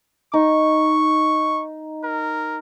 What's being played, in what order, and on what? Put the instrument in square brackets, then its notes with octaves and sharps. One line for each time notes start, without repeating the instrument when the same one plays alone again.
[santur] D#4 [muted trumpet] C#6
[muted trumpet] A#4